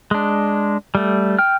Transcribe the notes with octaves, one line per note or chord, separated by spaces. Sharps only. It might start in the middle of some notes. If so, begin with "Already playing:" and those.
G#3 D4
G3 A3
G5 F6